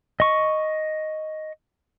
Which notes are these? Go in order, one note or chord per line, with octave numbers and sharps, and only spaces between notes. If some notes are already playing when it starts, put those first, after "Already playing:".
D#5 C#6